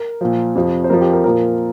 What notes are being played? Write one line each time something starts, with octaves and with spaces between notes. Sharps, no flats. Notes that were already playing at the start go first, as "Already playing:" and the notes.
Already playing: A#4
A#2 F3
F2 C3 F3
C5
F2 F3 A#4
G4
A#4
A#2 F3 A#4